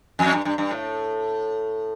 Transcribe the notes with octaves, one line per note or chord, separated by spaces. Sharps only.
F2
G2
G2
G2
A2